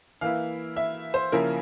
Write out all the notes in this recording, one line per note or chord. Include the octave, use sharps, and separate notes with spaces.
E3 A#3 E4 F5
E5
C5
C#3 F3 A#3 E4 A#4